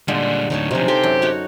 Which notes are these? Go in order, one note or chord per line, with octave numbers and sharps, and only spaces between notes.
A#2 D3 G3 G#3 F4
D2 A2 D#4 C#5 A5
B1 C3 F3 C#4 D#4
G4 A4 C5 G#5
F#2
D#4 F#4 C#5